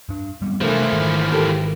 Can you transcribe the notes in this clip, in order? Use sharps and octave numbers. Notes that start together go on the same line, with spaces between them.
G2 D4
G3 B3 C4
C3 E3 F3 A3 D4 A#4 B4
G#2 D#3
G4 A4 A#4